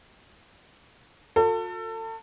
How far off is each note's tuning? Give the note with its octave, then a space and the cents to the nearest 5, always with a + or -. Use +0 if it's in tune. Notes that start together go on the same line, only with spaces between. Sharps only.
F#4 -45 A4 +35